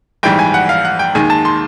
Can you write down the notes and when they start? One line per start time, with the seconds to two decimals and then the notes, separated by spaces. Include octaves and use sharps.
0.23 A#1 G#2 E3 G3 G5
0.39 G#5
0.54 F#5
0.69 F5
0.85 F#5
0.99 G5
1.15 D#2 D#3 G#3 G#5
1.30 A5
1.45 C6